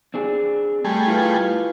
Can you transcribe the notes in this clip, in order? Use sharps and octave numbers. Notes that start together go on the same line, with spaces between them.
C4 D4 G#4
G3 A3 G#4
E4 F4 B4